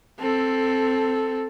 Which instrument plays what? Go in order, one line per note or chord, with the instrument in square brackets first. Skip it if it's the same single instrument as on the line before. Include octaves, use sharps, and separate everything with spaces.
[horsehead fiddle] C4 A4